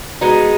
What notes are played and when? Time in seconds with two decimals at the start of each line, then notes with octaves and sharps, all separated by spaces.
0.21 G#3 B3 D#4 F#4